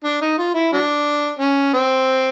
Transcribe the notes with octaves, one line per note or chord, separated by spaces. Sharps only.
D4
D#4
F4
E4
F#3 D4
C#4
C4